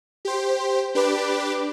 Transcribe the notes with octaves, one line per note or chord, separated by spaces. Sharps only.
G4 C5
D4 G4 B4 D6